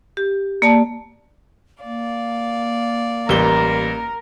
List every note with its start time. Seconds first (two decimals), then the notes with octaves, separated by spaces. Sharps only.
0.17 G4
0.62 A#3 D5 A5
1.84 A#3 D5 F5
3.29 A1 G3 A#4 G7